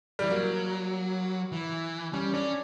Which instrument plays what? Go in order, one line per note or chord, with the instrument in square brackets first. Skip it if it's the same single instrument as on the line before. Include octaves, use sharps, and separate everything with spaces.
[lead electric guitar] E3 [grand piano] G3
[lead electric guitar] F#3 [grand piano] A#3
[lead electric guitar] E3
[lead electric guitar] G3 [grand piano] C#4
[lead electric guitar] C#4 [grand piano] D4